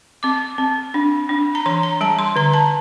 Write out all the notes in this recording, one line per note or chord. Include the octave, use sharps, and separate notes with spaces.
C4 D6
C4
D4
D4
A#5
E3 C6
A#5
G3 A5
C6
D3 A#5
A5